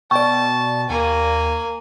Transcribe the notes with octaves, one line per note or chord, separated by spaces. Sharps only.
B2 D5 G5 A5 C#6
D#2 A#3 G#5